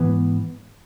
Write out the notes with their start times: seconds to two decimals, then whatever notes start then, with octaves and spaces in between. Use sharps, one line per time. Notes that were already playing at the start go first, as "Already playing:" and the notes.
Already playing: G#2 E3 B3